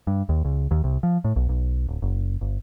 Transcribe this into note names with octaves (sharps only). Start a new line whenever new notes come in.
G2
D#2
C#2
D#2
C2
F3
A2
B1
B1
D1
F#1
G1